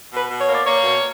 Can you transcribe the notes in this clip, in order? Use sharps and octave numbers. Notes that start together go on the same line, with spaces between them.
B2
B4
B2
C#5
A#3
D5
A#3 C#5
B2